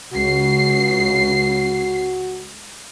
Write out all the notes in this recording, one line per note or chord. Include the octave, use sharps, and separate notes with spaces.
C#2 C#3 F#4 C7